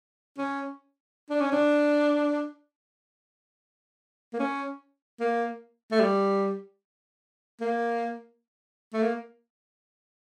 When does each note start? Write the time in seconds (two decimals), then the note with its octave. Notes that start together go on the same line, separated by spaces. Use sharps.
0.38 C#4
1.30 D4
1.41 C#4
1.52 D4
4.34 A#3
4.39 C#4
5.20 A#3
5.92 A3
6.00 G3
7.61 A#3
8.94 A3
9.03 A#3